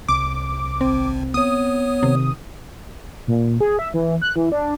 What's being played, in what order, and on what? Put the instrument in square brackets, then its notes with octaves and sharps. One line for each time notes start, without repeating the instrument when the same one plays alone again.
[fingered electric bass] C2 [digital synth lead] D6
[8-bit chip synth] G#1 [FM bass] C4
[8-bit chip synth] B3 C#5 [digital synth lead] D#6
[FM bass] C3 [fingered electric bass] D#3
[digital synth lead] A#2
G#4
E5
E3
F#6
E3
D4